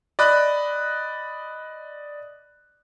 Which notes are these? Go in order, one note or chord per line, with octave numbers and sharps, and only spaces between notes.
D5 D#5 B5 F#6